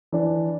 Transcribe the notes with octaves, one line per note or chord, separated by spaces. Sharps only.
E3 D4